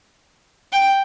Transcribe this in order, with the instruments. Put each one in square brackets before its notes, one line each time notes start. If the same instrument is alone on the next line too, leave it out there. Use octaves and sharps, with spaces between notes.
[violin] G5